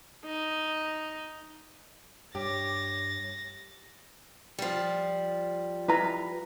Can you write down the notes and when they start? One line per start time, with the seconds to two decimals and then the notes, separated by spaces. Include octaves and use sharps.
0.25 D#4
2.35 G2 G4 C#5 A6 A#6
4.58 F3 G3
5.88 E4 B4 A#5